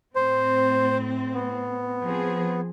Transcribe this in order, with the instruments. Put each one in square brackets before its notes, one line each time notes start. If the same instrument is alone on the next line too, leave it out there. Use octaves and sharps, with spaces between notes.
[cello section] A2 C4 [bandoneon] C5
[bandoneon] B3
[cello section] F3 C4 G#4